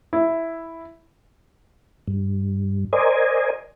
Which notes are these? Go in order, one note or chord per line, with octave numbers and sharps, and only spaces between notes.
E4
G2
A#4 C5 D5 D#5 G#5